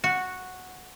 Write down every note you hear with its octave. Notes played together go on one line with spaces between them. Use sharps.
F#4